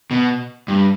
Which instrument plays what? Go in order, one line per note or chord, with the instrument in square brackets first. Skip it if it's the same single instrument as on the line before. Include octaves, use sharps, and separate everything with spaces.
[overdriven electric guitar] B2
G2